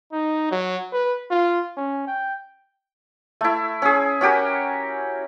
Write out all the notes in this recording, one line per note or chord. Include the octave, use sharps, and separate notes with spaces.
D#4
F#3
B4
F4
C#4
G5
A3 E4
C#4 G#4
C#4 F#4 G4 A#4